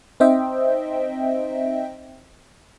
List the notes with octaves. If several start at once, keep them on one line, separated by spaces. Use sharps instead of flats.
C4 D#4 C5 D#5 E5 G5